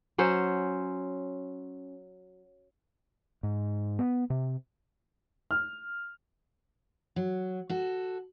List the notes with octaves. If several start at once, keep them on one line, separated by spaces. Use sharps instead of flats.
F#3 C#4 C5
G#2
B3
C3
F6
F#3
F#4 A4